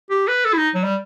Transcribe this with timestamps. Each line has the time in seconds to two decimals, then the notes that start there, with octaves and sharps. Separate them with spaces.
0.10 G4
0.28 B4
0.45 A4
0.53 E4
0.58 D#4
0.75 F#3
0.84 G3